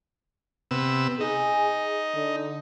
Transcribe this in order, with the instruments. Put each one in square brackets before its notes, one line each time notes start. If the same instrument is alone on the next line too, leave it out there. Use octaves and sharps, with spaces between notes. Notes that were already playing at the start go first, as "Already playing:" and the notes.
[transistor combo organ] C3 B3 E6
[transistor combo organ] D#4 [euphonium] G#4
[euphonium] D3